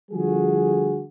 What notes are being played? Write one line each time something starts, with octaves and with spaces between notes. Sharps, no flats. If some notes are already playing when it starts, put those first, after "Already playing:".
D3 F3 G3 A3 F#4 G#4